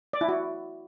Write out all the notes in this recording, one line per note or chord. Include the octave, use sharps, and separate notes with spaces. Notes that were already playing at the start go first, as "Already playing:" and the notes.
D5
E4
F#4